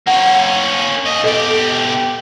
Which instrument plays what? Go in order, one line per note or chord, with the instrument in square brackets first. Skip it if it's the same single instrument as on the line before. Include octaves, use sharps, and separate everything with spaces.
[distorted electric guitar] A#3 C#4 [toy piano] F#5
[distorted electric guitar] A#3 D#5
[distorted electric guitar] B2 G4 [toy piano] A4 D#5 D6